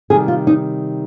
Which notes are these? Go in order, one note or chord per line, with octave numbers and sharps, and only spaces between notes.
C3 D#3 G3 G#4
F4
D#4